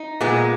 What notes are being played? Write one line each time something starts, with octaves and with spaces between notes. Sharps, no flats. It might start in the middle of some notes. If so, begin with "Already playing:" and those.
Already playing: D#4
A#2 G#3 B3